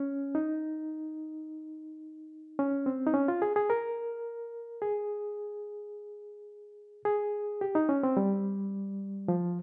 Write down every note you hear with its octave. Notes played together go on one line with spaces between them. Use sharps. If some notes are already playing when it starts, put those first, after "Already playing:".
Already playing: C#4
D#4
C#4
C4
D#4
C#4
F4
G#4
G#4
A#4
G#4
G#4
G4
D#4
C#4
C4
G3
F3